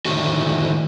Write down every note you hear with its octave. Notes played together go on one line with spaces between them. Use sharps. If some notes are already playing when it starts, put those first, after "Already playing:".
A2 D3 D#3 A3 F#4